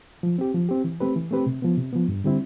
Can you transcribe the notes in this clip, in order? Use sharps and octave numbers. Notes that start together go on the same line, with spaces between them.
F3
C4 G4
F3
C4 G4
E3
A3 C4 G4 B4
E3
A3 C4 G4 B4
C3
F3 B3
C3
F3 B3
G2
D3 G3 C4 E4